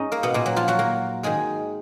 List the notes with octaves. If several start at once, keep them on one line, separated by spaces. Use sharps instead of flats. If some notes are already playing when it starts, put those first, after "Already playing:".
Already playing: G#2 C#4 D#4 D#5
A#3 A#4
B2 B3
A#2 A#3
F#3
F3 F4
F#3 F#4
A#3 A#4
G#2 D#3 G#3 G#4